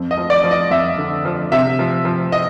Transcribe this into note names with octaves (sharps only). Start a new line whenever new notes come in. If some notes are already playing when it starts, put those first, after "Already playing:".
Already playing: F2
D#5
F3
D5
F3
D#5
F2 E5
D3
F3
C3 E5
F3
F3
D#5